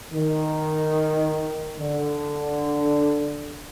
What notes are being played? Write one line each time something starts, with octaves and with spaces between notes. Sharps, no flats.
D#3
D3